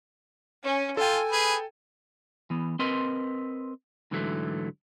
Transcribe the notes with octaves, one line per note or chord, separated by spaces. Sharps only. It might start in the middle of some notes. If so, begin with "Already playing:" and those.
C#4
F4 A4 G5 G#5
G#4 B4
E3 B3
C4 A#4 B4 D#5 C6
G#2 D3 E3 F#3 G#3 A3